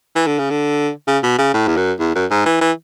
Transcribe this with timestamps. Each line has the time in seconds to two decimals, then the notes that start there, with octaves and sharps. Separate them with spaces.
0.15 E3
0.26 D3
0.38 C#3
0.50 D3
1.07 C#3
1.23 B2
1.38 C#3
1.54 A2
1.67 E2
1.77 F#2
2.00 E2
2.15 F#2
2.31 G#2
2.46 E3
2.61 E3